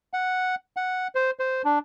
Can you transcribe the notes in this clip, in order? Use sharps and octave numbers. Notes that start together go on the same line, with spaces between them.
F#5
F#5
C5
C5
D4